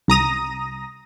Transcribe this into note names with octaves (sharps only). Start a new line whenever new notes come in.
C2 A#5 D#6 A#6